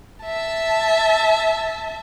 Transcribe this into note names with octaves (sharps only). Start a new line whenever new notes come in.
E5 A5